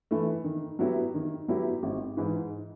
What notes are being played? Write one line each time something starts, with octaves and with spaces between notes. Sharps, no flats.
E3 A3
D#3
F#3 B3 E4 G4
D#3
F#3 B3 E4 G4
G#1
G#2 E3